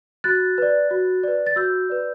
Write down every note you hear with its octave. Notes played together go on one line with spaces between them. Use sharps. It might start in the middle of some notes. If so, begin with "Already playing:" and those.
F#4 F#6 A6
B4 D5
F#4
B4 D5
A6
F#4 E6 G6
B4 D5